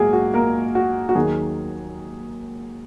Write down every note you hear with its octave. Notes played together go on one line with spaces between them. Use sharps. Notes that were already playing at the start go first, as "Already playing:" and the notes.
Already playing: A#1 G#2 F#3 A#3 F#4 G#4
F#4
A#3 A#4
F#4
F#4
D#2 D#3 F#3 G#4